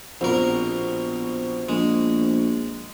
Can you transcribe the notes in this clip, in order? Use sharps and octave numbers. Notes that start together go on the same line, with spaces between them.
A#1 B2 C4 A#4
A#1 G#3